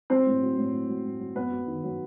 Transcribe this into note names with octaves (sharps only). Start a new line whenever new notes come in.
F#3 C4 C5
A2
F#3
A2
F#3
F#3
A2
F#3
F#2 B3 B4
F#3
D#3
F#3